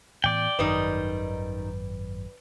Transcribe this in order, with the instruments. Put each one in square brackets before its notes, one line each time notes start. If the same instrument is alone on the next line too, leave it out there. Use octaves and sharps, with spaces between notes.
[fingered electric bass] A2 E3 B3 [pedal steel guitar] D5 G5
[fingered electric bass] G#1 F#2 [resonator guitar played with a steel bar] D#3 G3 D#4 [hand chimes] B4